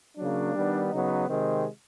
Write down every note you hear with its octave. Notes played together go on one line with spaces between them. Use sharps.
C#3 F#3 A#3 D4
D#3 G3 B3
C#3 F#3 B3 D#4
C3 D#3 G#3 C4